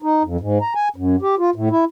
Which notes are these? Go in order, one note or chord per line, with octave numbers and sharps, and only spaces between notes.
D#4
F2
G#2
A#5
G#5
F#2
G4
F4
A2
E4